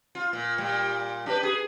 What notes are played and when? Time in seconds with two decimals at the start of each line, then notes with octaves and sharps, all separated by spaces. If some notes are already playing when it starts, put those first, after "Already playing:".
0.15 F4
0.33 A#2
0.58 A#2 G3
1.26 D4 G4 B4
1.43 G#4